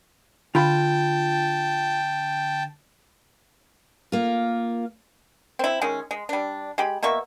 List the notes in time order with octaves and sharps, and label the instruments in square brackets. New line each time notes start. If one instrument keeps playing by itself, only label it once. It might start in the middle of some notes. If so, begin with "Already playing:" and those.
[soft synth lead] D3 [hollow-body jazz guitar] F4 B5 [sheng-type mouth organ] G5 A5
[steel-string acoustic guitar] A#3 F4
[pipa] C4 E4
D#3 G#3 C#4
G#3
G3 D4
G#3 G4 B5
B2 A#3 E5 C#6